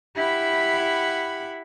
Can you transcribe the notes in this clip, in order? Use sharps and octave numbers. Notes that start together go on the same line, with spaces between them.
E4 G4 F#5 B5